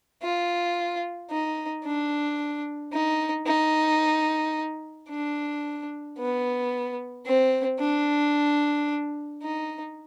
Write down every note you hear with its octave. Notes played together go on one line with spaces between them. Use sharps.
F4
D#4
D4
D#4
D#4
D4
B3
C4
D4
D#4